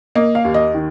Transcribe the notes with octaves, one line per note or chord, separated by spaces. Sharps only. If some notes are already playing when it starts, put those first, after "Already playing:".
A#3 D#5
F5
D#2
D#5
D#3